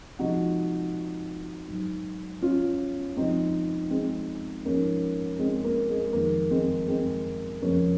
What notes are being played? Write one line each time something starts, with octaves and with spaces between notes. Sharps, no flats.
C3 F3 G#3 D#4 F#4
G#2 F#3
C#4 F4
C3 F3 G#3 C4 D#4
G#3 C4
G#2 F3 G#3 A#3 C#4
G#3 C4
A#3
G#3
F2 D#3 G#3 A#3
G#3 C4
G#3 C4
F2 C#3 F3 G#3 A#3 C#4